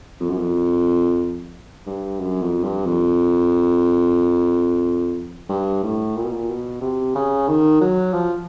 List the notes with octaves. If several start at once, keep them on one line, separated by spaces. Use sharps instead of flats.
F2
F#2
F2
G2
F#2
F2
G2
F2
G2
A2
A#2
B2
A#2
B2
C3
C#3
D#3
F#3
F3